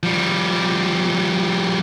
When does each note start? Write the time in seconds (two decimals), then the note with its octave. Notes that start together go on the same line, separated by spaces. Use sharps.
0.03 F3 G3